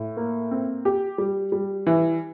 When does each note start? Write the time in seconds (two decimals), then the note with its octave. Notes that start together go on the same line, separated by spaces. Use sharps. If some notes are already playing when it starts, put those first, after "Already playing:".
Already playing: A2
0.17 A#3
0.51 C4
0.85 G4
1.18 G3
1.52 G3
1.87 E3